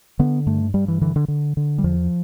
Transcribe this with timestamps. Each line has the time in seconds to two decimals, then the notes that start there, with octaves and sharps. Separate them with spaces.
0.19 D3 B3
0.46 G2 A3
0.74 G2 G3
0.88 E3
1.01 D3 E3
1.16 D3
1.28 D3
1.57 D3
1.78 G3
1.84 E2 F3